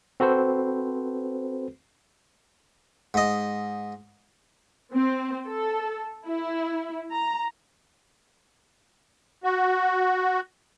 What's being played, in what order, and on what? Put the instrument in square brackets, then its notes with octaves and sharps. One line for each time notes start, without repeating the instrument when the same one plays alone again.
[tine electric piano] C4 F#4 A4 B4 C5
[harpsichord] G#2 D#5
[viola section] C4
A4
E4
A#5
[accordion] F#4